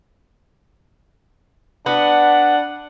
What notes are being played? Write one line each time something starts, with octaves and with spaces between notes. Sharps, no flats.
B3 D4 F#5